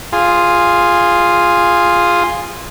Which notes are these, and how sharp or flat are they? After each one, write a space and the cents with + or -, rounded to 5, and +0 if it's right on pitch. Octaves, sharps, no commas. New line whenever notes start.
F4 +0 G#4 -15